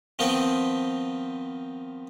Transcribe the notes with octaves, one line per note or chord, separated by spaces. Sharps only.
D#3 F3 B3 C4 D#4 B4